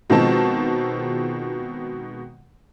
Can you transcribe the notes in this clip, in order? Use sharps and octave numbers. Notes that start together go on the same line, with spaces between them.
B2 D#3 F3 G#3 C4 A5